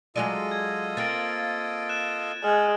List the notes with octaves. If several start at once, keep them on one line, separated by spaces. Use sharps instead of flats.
F#3 G#3 F4 A4 D5 D#5 D#7
G#6
A#3 C4 A6 D7
F#6 E7
G#3 F#5 F6